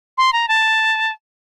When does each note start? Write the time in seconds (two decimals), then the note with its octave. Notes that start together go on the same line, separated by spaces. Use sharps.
0.18 C6
0.33 A#5
0.48 A5